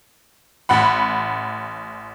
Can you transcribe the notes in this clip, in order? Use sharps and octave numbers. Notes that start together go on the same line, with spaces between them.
A1 F#5 B5